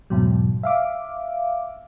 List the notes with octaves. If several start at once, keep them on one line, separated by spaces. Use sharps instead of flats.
E2 G#2 B2 F#3
E5 F5 D6